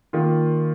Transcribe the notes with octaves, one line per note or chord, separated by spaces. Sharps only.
D#3 A#3 F4